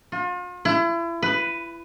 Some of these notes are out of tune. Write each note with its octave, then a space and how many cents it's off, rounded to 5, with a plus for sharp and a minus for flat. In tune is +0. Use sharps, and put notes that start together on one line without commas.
F4 +40
E4 +35
B4 +10